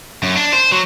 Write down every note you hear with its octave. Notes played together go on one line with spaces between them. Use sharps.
F#2
D4
C5
F#3